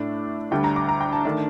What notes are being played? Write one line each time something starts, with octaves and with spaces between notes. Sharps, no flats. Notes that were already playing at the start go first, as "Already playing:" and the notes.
Already playing: A2 A3 D4
D2 D3 G3 D4 G5
A#5
D6
A#5
G5
A5
D#3 A3 D4